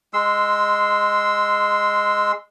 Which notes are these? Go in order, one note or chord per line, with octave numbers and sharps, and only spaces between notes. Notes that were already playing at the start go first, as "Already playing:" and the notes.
G#3 C6 E6